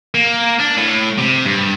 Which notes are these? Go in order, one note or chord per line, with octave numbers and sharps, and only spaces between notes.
A#3
D4
A2
C3
G2